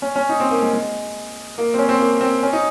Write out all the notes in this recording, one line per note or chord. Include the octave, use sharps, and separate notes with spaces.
C#4
C#4
D#4
C4
A#3
G#3
G#3
A#3
C4
C#4
C4
A#3
C4
C#4
D#4